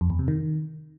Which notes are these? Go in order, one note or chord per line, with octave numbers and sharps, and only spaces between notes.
F2
E2
C3
D#3